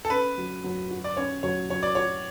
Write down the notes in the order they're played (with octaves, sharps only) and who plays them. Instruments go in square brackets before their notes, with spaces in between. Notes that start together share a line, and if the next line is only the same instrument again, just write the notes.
[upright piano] A4
[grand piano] C#4 [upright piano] B4
[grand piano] F#3
F#3
F#4
[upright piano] D5
[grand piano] C#4 [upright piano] C#5
[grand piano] F#3 [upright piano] C#5
[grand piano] F#3 [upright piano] C#5
[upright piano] D5
[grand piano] F#4 [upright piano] C#5